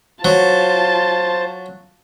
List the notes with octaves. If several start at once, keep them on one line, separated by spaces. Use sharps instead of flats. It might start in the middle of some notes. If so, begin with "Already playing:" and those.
F#3 F4 C5 A5